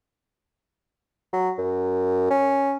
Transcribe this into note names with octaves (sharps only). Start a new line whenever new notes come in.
F#3
F#2
C#4